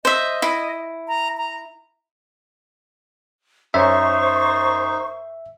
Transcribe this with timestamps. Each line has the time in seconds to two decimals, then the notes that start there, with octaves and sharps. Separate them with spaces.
0.05 C5 D#5 E5
0.42 E4
1.08 A#5
1.37 A#5
3.74 F#2 C#4 D#4 C5 E5 C#6